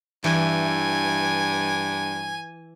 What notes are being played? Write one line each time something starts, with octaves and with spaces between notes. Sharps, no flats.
G2 E3 G#5